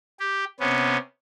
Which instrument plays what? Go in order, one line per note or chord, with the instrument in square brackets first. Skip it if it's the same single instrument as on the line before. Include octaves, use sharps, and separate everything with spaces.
[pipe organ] G4
C3 B3 C#4